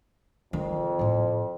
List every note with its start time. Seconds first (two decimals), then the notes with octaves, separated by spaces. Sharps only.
0.53 F2 D#3
0.99 A2 E4